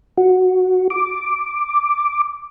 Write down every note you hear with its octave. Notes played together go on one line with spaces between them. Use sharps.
F#4
D6